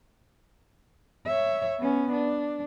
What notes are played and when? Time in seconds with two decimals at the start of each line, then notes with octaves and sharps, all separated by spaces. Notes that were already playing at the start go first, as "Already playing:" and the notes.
1.26 C#5 E5
1.80 B3 C#4
2.13 D4